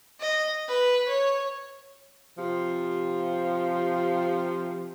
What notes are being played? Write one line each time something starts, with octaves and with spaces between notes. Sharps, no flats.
D#5
B4
C#5
C3 F3